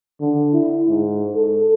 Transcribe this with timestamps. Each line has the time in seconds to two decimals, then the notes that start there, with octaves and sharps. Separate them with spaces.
0.21 D3
0.53 E4
0.89 G#2
1.36 A4